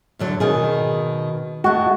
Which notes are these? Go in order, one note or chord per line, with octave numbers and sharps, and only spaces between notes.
E2 D3 F#3
B2 D#3 G#4
G#3 A3 F#4